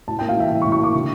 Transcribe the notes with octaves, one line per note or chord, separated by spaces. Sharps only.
A2 A5
G5
A#3
F5
E3 E5
A2 F5
C#6
A2
C#6
A#3 D6
D3